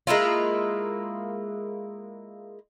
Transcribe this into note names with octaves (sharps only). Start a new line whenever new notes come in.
G#3 A#3 E4 F4